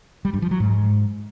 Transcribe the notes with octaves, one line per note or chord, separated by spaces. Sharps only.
G3
G2
F3
F#3
G#2